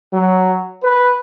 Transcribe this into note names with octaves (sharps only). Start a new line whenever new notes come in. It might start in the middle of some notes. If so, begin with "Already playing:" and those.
F#3
B4